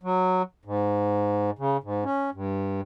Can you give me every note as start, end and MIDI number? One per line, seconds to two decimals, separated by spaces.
0.03 0.42 54
0.65 1.50 44
1.59 1.77 49
1.83 2.04 44
2.04 2.30 61
2.34 2.81 43